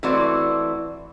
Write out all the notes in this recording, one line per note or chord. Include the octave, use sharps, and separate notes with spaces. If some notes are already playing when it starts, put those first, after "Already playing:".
E3 A3 C4 F#4 D5